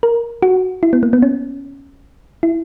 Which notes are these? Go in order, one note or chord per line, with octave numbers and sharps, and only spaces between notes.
A#4
F#4
E4
B3
A#3
B3
C#4
E4